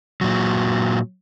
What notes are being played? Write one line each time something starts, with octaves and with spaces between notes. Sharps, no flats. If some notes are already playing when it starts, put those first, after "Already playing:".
A#2 F#3